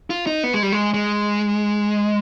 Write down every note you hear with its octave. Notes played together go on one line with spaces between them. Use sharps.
F4
D#4
B3
G#3
G3
G#3
G#3